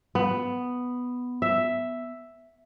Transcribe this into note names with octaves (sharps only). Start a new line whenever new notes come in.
B3
E5